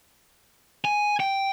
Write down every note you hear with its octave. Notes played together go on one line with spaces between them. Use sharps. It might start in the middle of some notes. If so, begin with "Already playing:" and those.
G#5
G5